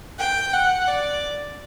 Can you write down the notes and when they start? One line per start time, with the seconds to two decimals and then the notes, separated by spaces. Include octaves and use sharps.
0.19 G5
0.53 F#5
0.88 D5